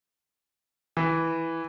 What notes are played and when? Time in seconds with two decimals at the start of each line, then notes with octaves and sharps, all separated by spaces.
0.97 E3